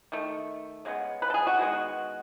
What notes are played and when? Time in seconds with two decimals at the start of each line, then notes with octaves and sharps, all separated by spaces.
0.12 D#3 A3
0.85 C#3 G#3 B3
1.22 B4
1.30 A4
1.34 G#4
1.47 F#4
1.58 D#3 G#3 B3 F#4